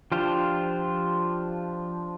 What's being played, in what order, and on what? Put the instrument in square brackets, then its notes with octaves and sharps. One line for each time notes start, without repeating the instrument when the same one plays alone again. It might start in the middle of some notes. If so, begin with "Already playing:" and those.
[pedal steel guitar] F3 D4 F4 G4 C5